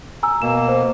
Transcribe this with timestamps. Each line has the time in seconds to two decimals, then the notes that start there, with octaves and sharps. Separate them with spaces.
0.23 G#5 A#5 E6
0.42 B2 A#3 E7
0.68 C5